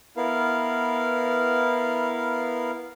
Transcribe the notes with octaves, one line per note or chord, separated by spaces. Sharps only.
B3 E4 A#4 F5